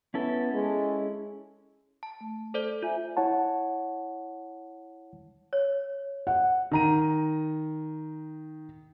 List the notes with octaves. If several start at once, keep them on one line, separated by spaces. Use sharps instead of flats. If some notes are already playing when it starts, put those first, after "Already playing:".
B3 C#4 E4 A4
G#3
A5
A3
A4 C5 D5
F4 C5 E5 G#5
E4 C#5 F#5 A5
C#5
F#5
D#3 A#5 D#7